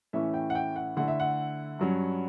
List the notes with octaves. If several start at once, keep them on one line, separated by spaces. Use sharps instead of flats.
A2 E3 A3 C#4 E5
G5
F#5
G5
F#5
D3 A3 E4 F#5
E5
F#5
G2 F#3 C#4